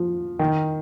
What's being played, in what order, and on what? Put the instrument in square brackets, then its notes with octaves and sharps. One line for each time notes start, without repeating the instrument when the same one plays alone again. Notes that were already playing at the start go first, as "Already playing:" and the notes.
Already playing: [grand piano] F3
D#3